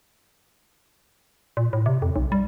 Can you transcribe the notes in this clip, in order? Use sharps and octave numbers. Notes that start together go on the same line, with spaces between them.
A#2
A2
C3
F2
B1
G3